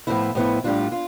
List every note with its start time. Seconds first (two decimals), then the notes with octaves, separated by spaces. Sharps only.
0.07 A2 F3 B3 E4
0.35 A2 F3 B3 E4
0.64 A2 G3 D4 F4
0.92 F4